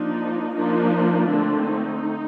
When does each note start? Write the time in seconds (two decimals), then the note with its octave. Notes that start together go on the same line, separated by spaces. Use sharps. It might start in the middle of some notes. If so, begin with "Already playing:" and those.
Already playing: F3 A#3 D4 D#4
0.55 F3 A#3 D4 D#4
1.27 D3 A3 C4 D4
1.65 D#4